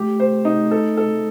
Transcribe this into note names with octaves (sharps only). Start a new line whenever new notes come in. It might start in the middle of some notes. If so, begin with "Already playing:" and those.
Already playing: A3 G4
C5
D#4
A4
A4